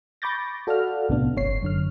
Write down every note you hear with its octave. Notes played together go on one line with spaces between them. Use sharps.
B5 C#6 D6 G6 A6 A#6
F#4 A4 D5 F5 F#5 F6
B1 A2 C3 B3 D4
G1 C#5 C7
F#2 D3 F6